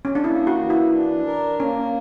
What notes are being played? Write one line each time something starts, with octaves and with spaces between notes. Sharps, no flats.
C#4
D4
A#3 E4
F#4
E3
E4
D4
A#4
A#3 C#4